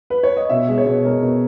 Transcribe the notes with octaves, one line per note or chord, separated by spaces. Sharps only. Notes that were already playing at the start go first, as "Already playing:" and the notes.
B4
C#5
D#5
B2 E5
G#3
C#5
B2
G#3 A#4
B2